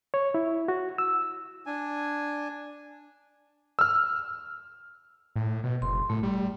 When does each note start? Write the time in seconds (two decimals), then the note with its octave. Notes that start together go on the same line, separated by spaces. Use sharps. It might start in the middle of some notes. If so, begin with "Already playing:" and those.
0.14 C#5
0.34 E4
0.68 F#4
0.98 E6
1.66 D4 G#5
3.79 E6 F6
5.36 A2
5.64 B2
5.82 F#1 C6
6.10 A2 A3
6.23 G3